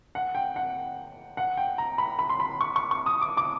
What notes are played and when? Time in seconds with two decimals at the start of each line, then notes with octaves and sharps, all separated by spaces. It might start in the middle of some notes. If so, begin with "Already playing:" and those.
0.15 F#5
0.35 G5
0.56 F#5
1.37 F#5
1.57 G5
1.78 A#5
1.98 B5
2.19 B5
2.29 C6
2.40 B5
2.61 C#6
2.76 C#6
2.91 C#6
3.06 D#6
3.22 D6
3.37 D6